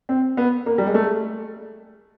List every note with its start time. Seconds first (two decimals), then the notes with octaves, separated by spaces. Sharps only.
0.09 C4
0.37 B3
0.66 A#3
0.78 G3
0.87 G#3
0.94 A3